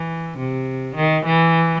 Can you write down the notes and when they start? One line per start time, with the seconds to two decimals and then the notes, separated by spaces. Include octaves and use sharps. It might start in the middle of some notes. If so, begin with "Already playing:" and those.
Already playing: E3
0.37 C3
0.95 D#3
1.25 E3